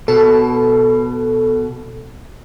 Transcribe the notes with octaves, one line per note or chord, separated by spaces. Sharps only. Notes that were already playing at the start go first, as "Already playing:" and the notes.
B2 A4